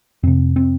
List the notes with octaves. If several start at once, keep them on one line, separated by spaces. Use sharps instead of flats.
F2 C3 C4
C4